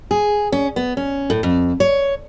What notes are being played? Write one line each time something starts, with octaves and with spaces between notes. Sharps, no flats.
G#4
C#4
B3
C#4
A2
F2
C#5